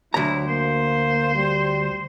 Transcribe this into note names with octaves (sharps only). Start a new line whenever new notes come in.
D2 F#3 E4 A#5
A#3 C5
G3